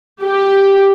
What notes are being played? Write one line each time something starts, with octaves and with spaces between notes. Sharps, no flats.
G4